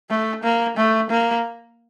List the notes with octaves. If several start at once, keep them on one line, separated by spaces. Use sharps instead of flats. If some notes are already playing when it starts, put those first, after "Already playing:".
A3
A#3
A3
A#3